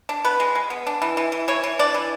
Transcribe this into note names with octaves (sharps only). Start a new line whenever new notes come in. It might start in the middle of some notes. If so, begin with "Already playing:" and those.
D4
B3 B4
G#3
G#3
B3
D4
E3
E3
E3
E3 C#5
E3
D4 D5
E3